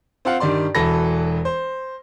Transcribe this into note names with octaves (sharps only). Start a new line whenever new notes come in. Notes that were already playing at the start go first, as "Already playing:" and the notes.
C4 F4 F5 F#5
G2 D#3 G3 D5 C6
E1 E3 F#4 A4 B5 A#6
C5